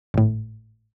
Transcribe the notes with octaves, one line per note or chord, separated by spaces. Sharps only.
G#1 A2